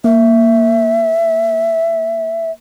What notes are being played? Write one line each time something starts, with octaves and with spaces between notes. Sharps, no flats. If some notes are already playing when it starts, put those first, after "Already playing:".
A#3 E5